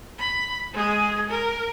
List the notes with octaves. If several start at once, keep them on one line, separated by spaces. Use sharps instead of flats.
B5
G#3 G#4
A#4